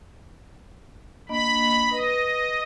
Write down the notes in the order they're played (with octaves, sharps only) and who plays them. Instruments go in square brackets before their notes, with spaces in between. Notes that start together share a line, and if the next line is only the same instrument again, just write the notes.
[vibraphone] A#3 D4 D#5 [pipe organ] B5
[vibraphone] B4 [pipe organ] D#5